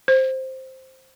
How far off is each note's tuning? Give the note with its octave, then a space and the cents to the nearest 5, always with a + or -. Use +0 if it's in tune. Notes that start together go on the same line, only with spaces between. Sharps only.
C5 +5